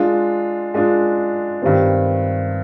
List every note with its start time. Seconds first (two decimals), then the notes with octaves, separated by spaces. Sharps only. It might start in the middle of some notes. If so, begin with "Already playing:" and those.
Already playing: G#3 D4 F4
0.74 G#3 D4 F4
1.62 G2 D#3 G3 C4